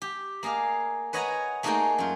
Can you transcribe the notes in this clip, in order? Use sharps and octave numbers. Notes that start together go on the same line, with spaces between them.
G4
A#3 G#4 D#5 F5
B4 C#5 D#5 F#5 G#5 A#5
A3 A#3 D#4 F#4 G#4 G5
F#2 F4